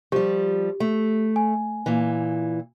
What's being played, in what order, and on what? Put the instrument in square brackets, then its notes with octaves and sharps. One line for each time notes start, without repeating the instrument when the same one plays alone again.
[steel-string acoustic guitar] F3 G3 [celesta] G4
[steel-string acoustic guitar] A3
[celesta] G#5
[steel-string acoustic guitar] A#2 E3